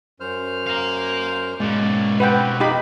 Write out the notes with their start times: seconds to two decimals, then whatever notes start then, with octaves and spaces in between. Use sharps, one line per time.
0.20 F#2 C5 F6
0.67 F5 A#5
1.60 G#2 B2 A#3 C#4 D5
2.20 C4 G4 B4 F#5 G5
2.60 F2 D#4 G4 F5 B5